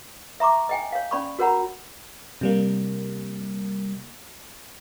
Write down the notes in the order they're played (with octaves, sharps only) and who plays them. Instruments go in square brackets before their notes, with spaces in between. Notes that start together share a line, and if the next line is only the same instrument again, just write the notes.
[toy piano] E5 A#5 C#6 D6
D#5 G5 G#5
C#5 F5
C#4 D5 B5 C#6
F#4 A#4 C#5 F#5 A#5 B5
[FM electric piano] C3 G3 A#3